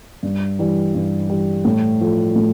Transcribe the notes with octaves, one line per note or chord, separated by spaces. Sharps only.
G2
E3 G3
G2
E3 G3
A2
F3 A3
A2